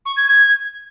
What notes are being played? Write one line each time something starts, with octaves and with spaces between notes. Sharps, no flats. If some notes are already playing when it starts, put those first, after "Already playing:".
C#6
G#6
G#6